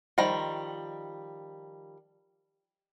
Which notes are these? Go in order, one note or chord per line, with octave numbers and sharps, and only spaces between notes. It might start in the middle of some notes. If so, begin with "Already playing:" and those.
D#3 F3 G3 A#5